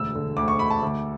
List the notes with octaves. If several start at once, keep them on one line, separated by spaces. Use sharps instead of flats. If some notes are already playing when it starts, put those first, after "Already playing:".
Already playing: E1 D2 E6
D3
D2 D6
C#6
D2 B5
A5
D2